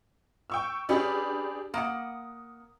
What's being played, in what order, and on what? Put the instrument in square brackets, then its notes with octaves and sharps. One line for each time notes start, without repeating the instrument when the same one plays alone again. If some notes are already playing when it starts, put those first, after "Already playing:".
[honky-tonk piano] G5 C#6 E6
[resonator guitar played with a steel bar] C#4 B4 [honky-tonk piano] D4 G4 G#4
[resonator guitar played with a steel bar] A#3 F#5 [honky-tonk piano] D#6